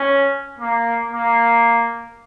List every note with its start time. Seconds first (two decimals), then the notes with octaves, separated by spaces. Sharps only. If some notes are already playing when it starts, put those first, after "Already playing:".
Already playing: C#4
0.59 A#3
1.11 A#3